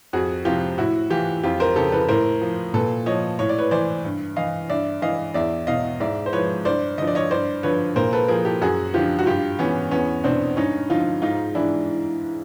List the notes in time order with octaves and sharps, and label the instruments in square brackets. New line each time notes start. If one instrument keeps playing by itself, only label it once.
[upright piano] F2 F#4 G#4
C3 F3 F4 G4
A2 E4 F#4
E3 F4 G4
F2 F4 G4
A#4 C5
C#3 F3 G4 A4
A4 B4
A2 A#4 C5
F3
A#2 A4 B4
F3 C#5 D#5
A2 C#5
D5
B4 C#5
E3 C5 D5
G2
E3 D#5 F5
G2 D5 E5
E3 D#5 F5
E2 D5 E5
B2 D#5 F5
G#2 D5 E5
C5
F3 B4 C#5
G2 C5 D5
D3 F3 D#5
D5
C#5 D#5
G2 C5 D5
D3 F3 B4 C#5
A#2 A#4 C5
A4 B4
F3 G#4 A#4
G4 A4
F#2 F#4 G#4
D3 F3 F4 G4
F#4
G2 F4 G4
E3 B3 C#4
E2 B3 C#4
B2 C4 D4
G2 C#4 D#4
D3 F3 D#4 F4
G#2 D#4 F4
E3 D4 E4